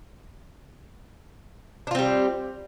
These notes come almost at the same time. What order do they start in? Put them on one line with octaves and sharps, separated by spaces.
D4 F4 C4 G3